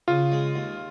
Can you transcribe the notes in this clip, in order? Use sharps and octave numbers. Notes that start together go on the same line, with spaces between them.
C#3 F4
G#3
D#2